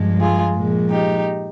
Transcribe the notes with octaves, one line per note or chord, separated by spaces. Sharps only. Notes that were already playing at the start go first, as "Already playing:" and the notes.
Already playing: G2 F3 G#3
F4 G#4
A#2 F3 G#3
D#4 G4